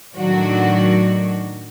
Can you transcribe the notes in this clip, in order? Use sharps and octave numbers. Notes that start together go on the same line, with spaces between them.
A2 D#3 F#3 D4 F#4